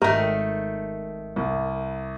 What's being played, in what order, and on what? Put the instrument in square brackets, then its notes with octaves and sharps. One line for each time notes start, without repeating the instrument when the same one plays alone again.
[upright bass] G#1 [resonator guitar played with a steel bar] D#3 A3 [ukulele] A#4
[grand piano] C2